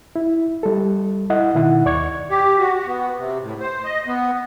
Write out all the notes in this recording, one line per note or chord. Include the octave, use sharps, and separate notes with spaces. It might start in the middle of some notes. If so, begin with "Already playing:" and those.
E4
G3 A4
E4 D#5 F#5
B2 D#3 E4 F#5
D#2 D5 C#6 G#6
G4
F#4
F#4
B3
C3
A2
C5
D#5
B3